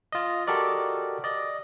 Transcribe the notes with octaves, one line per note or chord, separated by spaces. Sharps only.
F4 D#5
F#4 G4 A4 A#4 D5 D#5
D5 D#5